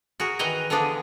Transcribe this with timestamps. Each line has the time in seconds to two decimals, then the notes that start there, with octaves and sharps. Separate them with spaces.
0.20 F#4 G#4 A#4
0.39 D#3 E3 B4 D#5 G#5 A#5
0.70 D3 E3 F3 B3 D4 G#4